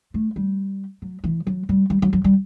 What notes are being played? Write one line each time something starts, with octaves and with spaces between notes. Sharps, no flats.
A3
G3
F#3
E3
F#3
G3
G3
F#3
F#3
G3